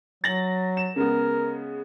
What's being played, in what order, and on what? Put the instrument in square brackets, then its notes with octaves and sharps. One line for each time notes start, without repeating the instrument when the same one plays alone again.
[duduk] F#3 [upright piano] A6 A#6 F#7
[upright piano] E7
[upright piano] C#3 G#3 B3 [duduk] A#4